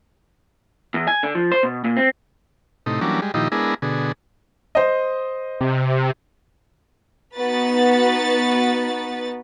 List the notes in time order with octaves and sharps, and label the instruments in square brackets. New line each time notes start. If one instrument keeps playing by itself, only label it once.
[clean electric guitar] E2
G#5
D3
F3
C5
B2
A#2
C4
[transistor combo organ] A2 C3 D#4
E3 F#3 G3 A#3 C#4 D4
G3 G#3
A#2 D#3 F3 D#4 E4 G4
G#3 B3 D4 E4 G#4 A#4
B2 D3 G#4
[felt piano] C5 D#5
[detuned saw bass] C3
[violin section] B3 D#4 F#4 B4 A6